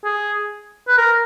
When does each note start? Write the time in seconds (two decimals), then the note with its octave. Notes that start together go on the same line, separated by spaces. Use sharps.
0.04 G#4
0.88 B4
0.98 A#4